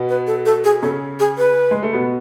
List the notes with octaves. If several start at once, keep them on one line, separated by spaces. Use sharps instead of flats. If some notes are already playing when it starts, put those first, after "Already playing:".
Already playing: B2 B3
B4
A4
A4
G#4
C#3 C#4 A4
G#4
B4
G#3
A3
B2 B3